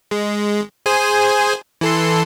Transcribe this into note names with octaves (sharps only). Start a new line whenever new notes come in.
G#3
G#4 C5 G#5
E3 A4 C6